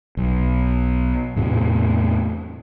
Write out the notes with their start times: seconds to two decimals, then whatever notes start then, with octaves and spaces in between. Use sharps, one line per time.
0.17 B1
1.36 E2 A2 C3 A3